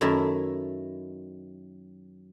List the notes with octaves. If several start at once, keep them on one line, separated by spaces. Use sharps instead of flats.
F#2 D#3 A3 E4 A#4 A5